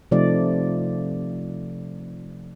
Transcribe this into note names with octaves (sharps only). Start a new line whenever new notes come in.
C3 F3 A3 D#4 D5